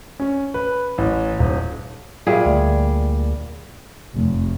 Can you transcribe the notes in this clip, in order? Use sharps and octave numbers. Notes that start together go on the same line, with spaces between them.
C#4
B4
A1
D#1
A#2 G3 F4 G#4 E5
D2
F1